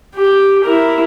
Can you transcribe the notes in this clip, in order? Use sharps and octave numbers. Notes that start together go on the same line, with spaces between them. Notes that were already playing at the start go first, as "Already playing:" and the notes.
G4
E4 A#4